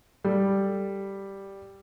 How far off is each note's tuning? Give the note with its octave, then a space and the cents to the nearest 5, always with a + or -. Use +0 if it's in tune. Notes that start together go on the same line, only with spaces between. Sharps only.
G3 +0 A4 +0